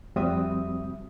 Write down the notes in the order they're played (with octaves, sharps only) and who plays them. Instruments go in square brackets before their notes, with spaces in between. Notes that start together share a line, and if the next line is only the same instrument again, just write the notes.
[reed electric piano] F2 G3 C4 F#4 E5 D#6